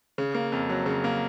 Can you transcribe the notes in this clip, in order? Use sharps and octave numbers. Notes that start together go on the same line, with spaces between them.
C#3
A#3
F2
F#3
C#3
A#3